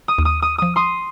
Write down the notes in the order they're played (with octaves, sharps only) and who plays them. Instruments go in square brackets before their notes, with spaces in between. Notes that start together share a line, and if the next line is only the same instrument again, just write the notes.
[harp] D#6
[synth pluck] D#2
[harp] D#6
D#6
[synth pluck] F3 [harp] D#6
[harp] C6 D#6